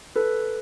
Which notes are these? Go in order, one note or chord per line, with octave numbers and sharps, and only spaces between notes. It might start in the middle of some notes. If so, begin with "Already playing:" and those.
A4 B4